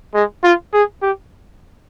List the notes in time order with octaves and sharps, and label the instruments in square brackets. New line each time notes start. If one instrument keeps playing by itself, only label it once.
[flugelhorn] G#3
F4
G#4
G4